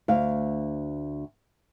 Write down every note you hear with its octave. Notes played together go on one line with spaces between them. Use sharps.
D2 F5